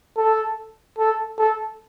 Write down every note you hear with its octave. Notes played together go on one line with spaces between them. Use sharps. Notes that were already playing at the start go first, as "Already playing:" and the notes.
A4
A4
A4